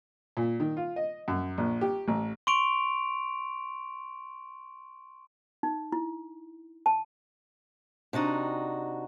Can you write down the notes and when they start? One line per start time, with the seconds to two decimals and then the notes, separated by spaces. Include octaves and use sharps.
0.37 A#2
0.60 D#3
0.77 F4
0.96 D#5
1.28 F#2
1.58 A#1
1.81 G4
2.08 A1
2.47 C6 C#6 D7 F7
5.63 D#4
5.92 E4
6.86 A5
8.13 C3 D4 D#4 F#4